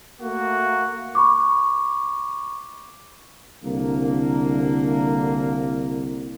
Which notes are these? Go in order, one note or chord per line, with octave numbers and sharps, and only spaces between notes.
A3 A#3 F#4
B5 C#6 D6
C2 D3 A#3